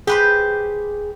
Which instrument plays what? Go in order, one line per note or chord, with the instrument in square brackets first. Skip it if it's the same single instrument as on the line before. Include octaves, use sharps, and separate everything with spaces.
[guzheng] G4 B4 C5 [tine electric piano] G#4